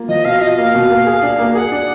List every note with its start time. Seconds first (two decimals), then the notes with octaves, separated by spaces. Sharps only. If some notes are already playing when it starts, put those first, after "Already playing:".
Already playing: A#3 F4
0.08 F3 D#5
0.25 B2 F5
0.41 F4 D#5
0.57 A#3 F5
0.74 B2
0.90 A#3
1.06 G#4
1.23 D4
1.39 A#3
1.55 G#4 F#5
1.72 D4